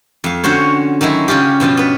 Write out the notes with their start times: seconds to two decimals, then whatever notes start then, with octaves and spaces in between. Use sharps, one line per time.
0.24 F2 F5
0.44 D3 C#4 F#4 C5 C#5
1.01 D#3 F#3 G#3 E4
1.28 C#3 C#4 F4 G4
1.60 G2 B2 F3 F4
1.77 B3 B4